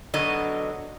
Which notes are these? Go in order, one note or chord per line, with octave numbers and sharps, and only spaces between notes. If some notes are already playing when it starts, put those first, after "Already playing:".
B2 D3 F#3 D#5